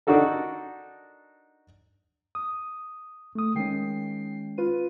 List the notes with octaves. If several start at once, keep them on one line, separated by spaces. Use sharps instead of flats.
D4 D#4 F#4 A4 A#4
D#6
A3 D#6
D#3 G#3 C#4 G5 C7
F4 B4 D#7